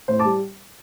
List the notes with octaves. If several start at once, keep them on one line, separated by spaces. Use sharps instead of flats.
A2 C5
A5 D6
G3